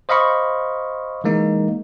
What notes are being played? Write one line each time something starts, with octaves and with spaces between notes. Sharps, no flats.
C5 D#5 F5 B5 C#6
E3 G#3 A#3 D#4